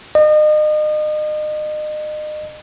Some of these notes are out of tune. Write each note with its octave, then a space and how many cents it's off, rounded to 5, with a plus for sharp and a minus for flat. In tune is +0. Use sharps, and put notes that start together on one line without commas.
D#5 -35